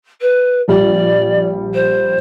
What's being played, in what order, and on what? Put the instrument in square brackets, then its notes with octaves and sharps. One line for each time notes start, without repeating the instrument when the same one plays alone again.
[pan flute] B4
[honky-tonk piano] A#1 G3 [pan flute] D5
[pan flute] C5